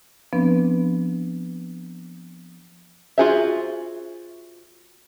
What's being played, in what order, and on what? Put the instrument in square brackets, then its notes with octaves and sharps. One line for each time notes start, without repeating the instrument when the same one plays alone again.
[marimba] F3 B3 C4 D4 B4
[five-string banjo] F4 F#4 G#4 C5 E5